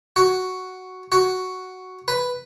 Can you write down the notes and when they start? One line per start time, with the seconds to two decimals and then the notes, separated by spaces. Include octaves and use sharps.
0.16 F#4
1.12 F#4
2.08 B4